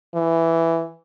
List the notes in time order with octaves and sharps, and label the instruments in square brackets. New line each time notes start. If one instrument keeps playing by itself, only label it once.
[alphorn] E3